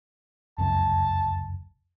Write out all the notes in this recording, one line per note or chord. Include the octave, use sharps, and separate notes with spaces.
F1 C#2 F#2 A5